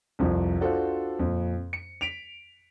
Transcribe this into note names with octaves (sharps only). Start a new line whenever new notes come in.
C2 F2 F3
D4 F4 F#4 A4 C5
F2 A#2
C#7
B6 D7 F7